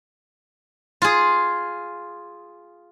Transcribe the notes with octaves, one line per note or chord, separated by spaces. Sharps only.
F4 G#4